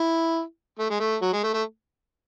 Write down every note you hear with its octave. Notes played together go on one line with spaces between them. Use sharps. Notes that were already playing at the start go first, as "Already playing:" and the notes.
Already playing: E4
A3
G#3
A3
F#3
G#3
A3
A3